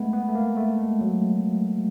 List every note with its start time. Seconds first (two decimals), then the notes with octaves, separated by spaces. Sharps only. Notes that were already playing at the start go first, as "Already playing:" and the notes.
Already playing: G#3 A3 B3
0.13 B3
0.29 A3
0.35 A#3
0.57 A3
0.79 G#3
1.01 F#3